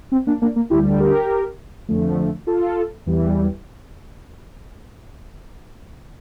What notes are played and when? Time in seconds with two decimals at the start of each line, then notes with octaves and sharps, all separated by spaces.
0.12 C4
0.27 A#3 D4
0.41 A#3 D4
0.56 A#3
0.70 D2 D3 G3 E4 G4
1.00 G4 A#4
1.88 F2 D3 F3 A3
2.47 F4 A4
3.06 E2 E3 G3